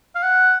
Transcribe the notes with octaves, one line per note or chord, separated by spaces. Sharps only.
F5
F#5